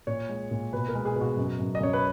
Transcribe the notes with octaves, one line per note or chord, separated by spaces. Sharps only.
A#2 C#5
G#3
A#2
B2 B4
A#4
G#3
G#4
B2
F#4
F#2
F#2
D#5
F#2 C#5
B4